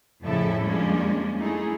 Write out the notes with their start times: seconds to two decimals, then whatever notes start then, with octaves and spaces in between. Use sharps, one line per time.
0.22 F2 A2 C#3 E4 A4 E5
0.62 F2 G3 G#3 A#3 C#4 D4
1.38 A3 D#4 E4 G#4